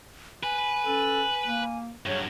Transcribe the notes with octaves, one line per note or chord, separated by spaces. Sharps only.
B4 G#5
C#4 A4
A#3
G2 F#3 G#4 C#5